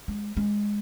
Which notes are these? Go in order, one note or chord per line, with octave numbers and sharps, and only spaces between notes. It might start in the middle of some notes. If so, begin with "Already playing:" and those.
G#3
G#3